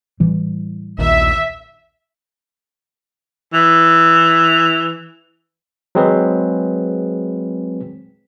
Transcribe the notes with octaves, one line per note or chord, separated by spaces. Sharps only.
A2 E3 G3
A#1 D#2 E5
E3
F#3 G#3 C4 G#4 B4